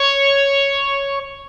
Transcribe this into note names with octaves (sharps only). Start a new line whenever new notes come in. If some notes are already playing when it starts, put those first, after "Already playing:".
Already playing: C#5